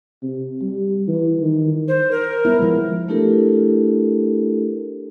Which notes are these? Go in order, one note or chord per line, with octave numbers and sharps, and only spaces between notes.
C3
G3
E3
D#3
C5
A#4
G3 B3 E4
F3 G#3
A3 D4 E4 G4 A4 A#4